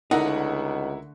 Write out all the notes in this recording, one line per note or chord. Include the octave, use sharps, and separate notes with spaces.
C#2 D3 A3 D#4 E4 A#4 F#5